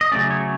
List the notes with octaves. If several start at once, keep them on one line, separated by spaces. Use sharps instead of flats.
D#5
C#3 F#3 A3 C#4 D5
C#5